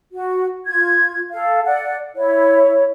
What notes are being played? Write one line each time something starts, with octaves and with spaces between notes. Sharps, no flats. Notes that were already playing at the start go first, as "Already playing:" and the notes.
F#4
F4 G#6
A4 F5
D5 F#5
E4 C#5